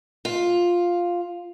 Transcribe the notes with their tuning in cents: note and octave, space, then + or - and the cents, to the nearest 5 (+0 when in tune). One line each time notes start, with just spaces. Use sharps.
F4 +5